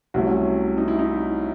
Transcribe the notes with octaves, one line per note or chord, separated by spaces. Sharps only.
C2 C3 F#3 A3 F#4
C#4
D#4
E4
D#4